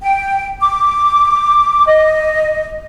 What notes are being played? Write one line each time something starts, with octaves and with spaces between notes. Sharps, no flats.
G5
D6
D#5